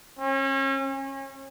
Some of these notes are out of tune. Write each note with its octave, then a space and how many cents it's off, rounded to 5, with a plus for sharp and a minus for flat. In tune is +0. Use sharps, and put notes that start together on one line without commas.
C#4 -35
C#4 -30